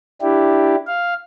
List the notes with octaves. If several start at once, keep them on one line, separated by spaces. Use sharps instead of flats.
D4 E4 G4
F5